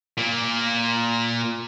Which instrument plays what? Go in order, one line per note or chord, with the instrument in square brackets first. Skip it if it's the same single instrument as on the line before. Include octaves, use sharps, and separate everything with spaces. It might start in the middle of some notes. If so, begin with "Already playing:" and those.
[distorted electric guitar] A#2 A#3